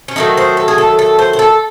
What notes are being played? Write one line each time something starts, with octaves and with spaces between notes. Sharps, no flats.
C#4
D#3 F#3 A3 D#4
C5
A4
G#4
A4
A4
C5
C5
A4